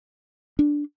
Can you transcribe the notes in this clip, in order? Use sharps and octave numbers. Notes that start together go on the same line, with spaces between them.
D4